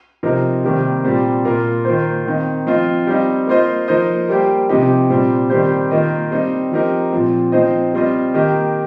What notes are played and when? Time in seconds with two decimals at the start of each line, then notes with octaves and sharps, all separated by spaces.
0.23 C3 F3 C4 D#4 A#4
0.64 C3 D#3 G3 A#3 G4
1.04 A#2 G3 C4
1.45 A#2 A#3 F4 A#4
1.85 D#3 A#3 F4 C5
2.26 D#3 C4 D#4
2.67 F3 C4 F4 D#5
3.07 G3 C4 D#4
3.47 A#3 F4 C5 D#5
3.88 F3 A#3 D#4 C5 D#5
4.29 G3 A#3 G4 C5
4.69 C3 F3 C4 D#4 G4
5.10 A#2 G3 C4
5.50 D#3 G3 C4 G4 C5
5.91 D#3 A#3 F4 D#5
6.31 G3 C4 D#4
6.72 F3 C4 D#4 G4 A#4
7.12 A#2 F3 C4
7.52 F3 C4 D#4 C5 D#5
7.93 G3 C4 F4 D#5
8.34 D#3 A#3 G4 A#4 D#5